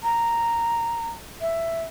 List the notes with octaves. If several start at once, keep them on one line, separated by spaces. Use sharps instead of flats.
A#5
E5